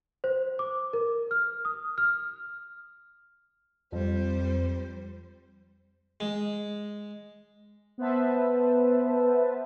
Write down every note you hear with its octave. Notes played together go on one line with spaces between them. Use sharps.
C5
D6
A#4
F6
D#6
F6
F2 G3 C5
G#3
B3 B4 C5 E5 A5